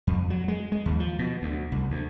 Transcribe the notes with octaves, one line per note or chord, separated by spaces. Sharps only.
F2
F#3
G#3
G#3
D#2
F3
B2
D2
C2
D2